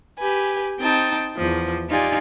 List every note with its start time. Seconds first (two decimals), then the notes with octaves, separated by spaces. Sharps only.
0.18 G4 B4 G#5
0.79 C4 D#4 G5 A5
1.36 E2 F3
1.89 D#4 F4 G4 D5 G#5